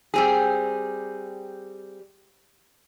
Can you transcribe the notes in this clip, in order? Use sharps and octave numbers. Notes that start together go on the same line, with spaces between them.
G3 C4 G#4